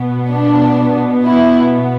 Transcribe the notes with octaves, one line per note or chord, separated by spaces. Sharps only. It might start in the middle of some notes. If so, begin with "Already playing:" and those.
Already playing: B2 B3
D4
E4